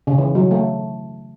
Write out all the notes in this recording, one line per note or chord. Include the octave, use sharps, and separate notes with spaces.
C#3
E3
F#3
A3